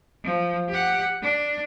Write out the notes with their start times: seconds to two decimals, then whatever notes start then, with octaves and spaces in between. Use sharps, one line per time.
0.24 F3
0.69 G4 F#5
1.22 D4